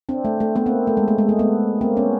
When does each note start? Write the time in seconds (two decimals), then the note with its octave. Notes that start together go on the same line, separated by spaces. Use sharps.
0.09 C4 D4
0.25 A3
0.40 A3
0.56 A3 B3
0.66 A#3 C4
0.87 A3
0.97 G#3
1.08 A3
1.18 G#3
1.29 A3
1.39 A3 B3
1.81 A#3 C4
1.97 B3 C#4